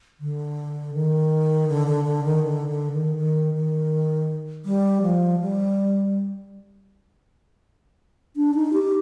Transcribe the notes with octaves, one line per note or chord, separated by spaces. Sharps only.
D3
D#3
D3
D3
D3
D#3
D3
D3
D#3
D#3
D#3
G3
F3
G3
D4
D#4
G4